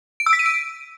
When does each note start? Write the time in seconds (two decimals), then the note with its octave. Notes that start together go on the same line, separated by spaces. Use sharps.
0.20 D7
0.26 E6
0.33 B6
0.39 D#7
0.46 D7